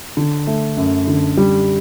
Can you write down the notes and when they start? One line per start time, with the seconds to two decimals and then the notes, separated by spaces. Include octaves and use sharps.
0.17 D3
0.47 A3
0.77 F#2
1.08 D3
1.37 G3